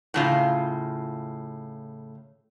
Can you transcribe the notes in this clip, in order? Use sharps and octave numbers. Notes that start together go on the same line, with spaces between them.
A2 C#3 F4